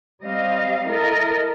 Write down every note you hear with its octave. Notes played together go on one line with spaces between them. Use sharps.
G3 C4 D#5 F5
E4 A4 A#4 D#5